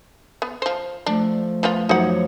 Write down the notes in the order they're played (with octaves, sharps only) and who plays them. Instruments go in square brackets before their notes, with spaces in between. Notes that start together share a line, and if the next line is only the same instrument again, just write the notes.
[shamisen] B3
F3 C5
[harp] F3 A3 [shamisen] D4
[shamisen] F3 B3 F4
[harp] F#2 F3 C#5 [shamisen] D#4 F#5